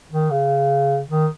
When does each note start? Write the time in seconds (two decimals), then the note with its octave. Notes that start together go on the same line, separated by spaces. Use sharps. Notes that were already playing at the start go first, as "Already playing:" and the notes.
0.12 D#3
0.31 C#3
1.09 D#3